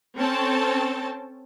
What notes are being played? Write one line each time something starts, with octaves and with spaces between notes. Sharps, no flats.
C4 C#4 A4 G5 A5